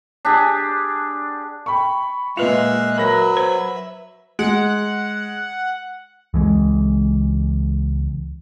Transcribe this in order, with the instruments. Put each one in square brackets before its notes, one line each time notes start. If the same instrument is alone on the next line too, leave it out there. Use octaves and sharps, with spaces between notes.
[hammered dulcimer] D4 G4 G#4
[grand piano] G5 B5 C#6
[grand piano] A#2 F7 [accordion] G#3 F5 F#6 [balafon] F4 B4 [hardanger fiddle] E5
[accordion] F#3 [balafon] A#4 [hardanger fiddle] B4 E5 [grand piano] B5 A#6 F#7
[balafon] C5
[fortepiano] G#3 [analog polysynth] F#5
[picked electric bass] C#2 E3 G#3